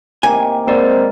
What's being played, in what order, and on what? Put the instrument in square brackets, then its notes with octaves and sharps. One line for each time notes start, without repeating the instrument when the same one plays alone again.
[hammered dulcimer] C3 D#3 A#3 [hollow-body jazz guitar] G#5
[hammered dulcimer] G#2 [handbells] A#3 A#4 D5 [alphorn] C4